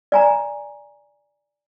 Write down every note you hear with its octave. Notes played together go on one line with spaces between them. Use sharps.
D5 G#5 A#5